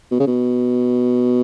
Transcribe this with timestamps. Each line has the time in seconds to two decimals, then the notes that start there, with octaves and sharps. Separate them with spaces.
0.12 B2
0.20 C#3
0.27 B2